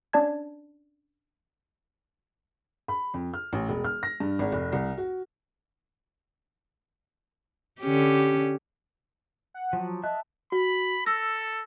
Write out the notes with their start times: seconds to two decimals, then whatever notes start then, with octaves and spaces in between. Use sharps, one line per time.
0.13 C#4 D4 D5 A5 G#6
2.88 B5
3.14 F2
3.34 F6
3.53 A1
3.69 E1
3.84 F6
4.03 A#6
4.20 G2
4.39 G#1
4.52 F1
4.72 C2
4.98 F#4
7.81 D3 C#4 G4
9.54 F#5
9.73 F3 F#3
10.04 D#5 E5 A5 F#6
10.52 F#4 B5
11.06 A4 E6 A#6